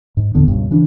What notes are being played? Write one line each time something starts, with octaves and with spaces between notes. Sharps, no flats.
G#2
A1 E2 D3 B3
C#2 G2 B2
C#3 E3 D4